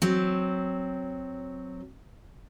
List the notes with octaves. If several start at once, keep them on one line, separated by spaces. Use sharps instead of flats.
F#3 C4